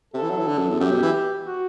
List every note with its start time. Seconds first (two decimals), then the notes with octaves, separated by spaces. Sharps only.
0.14 C3 A4
0.22 E3
0.30 F#3
0.39 E3
0.47 D3
0.58 F#2
0.69 E2
0.79 F#2 G4
0.91 B2
1.02 E3
1.46 F#4